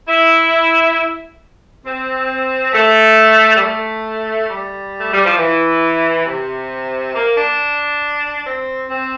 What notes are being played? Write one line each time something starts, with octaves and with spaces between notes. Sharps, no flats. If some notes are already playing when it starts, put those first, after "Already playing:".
E4
C4
A3
G3
A3
G3
A3
G3
F3
E3
C3
A#3
D4
C4
C4